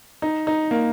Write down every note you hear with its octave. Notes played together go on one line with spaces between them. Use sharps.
D#4
D#4
A#3